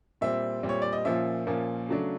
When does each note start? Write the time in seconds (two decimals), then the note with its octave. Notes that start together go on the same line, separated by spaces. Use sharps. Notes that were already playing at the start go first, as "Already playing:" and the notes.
0.21 A#2 G3 C4 E5
0.63 A#2 G3 C4
0.69 C#5
0.82 D5
0.93 D#5
1.05 A#2 F3 A#3 C#4 E5
1.47 A#2 F3 A#3 C#4
1.89 C#3 F#3 A3 D4